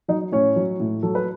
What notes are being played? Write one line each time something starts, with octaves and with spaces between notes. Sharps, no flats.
F#3 D#4 D#5
A2 C#4 C#5
F#3
A2
F#3 A4
B4